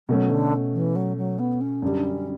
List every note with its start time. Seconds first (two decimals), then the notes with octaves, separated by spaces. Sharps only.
0.08 B2 F#3 A3 C#4
0.30 D3
0.73 E3
0.95 F#3
1.17 F#3
1.39 B3
1.61 C#4
1.82 F#2 D3 G3 D4
2.04 C#4